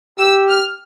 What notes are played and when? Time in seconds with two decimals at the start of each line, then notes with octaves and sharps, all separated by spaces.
0.19 G4 E6
0.49 F6